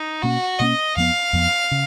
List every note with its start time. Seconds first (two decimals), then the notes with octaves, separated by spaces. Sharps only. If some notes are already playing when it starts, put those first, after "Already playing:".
Already playing: D#4
0.23 B2 A#3 C#4 F#4
0.59 B2 A#3 C#4 D#5
0.96 F2 F3 B3 F5
1.33 F2 F3 B3
1.71 C#3